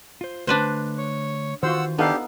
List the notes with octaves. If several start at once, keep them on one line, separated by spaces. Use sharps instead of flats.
F4 C5
D3 A3 D4 B4 C5
C#5
D#3 E3 F4 F#4 C5 F#5 E6
B3 D4 D#4 G4 A4 F5